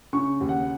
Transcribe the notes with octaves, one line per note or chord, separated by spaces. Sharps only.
C#3 C#6
D#2
F#5